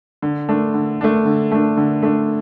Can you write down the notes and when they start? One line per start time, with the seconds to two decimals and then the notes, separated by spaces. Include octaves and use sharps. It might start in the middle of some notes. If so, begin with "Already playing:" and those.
0.22 D3
0.49 A3 D4
0.74 D3
1.01 A3 D4
1.26 D3
1.52 A3 D4
1.77 D3
2.03 A3 D4